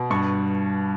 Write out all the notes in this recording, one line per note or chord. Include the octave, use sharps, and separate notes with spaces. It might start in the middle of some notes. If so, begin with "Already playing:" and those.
Already playing: B2
G2 C#6